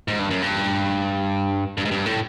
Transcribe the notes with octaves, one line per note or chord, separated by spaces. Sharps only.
G#2
G2
F#2
G2
G2
G#2
G2
A2